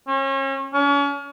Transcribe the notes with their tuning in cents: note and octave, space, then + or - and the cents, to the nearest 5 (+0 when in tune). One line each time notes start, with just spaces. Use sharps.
C#4 -35
C#4 +35